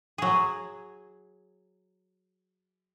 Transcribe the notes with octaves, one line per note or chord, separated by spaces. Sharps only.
F#3 G#4